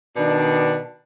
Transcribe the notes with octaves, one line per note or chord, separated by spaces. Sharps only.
B2 D#3 D4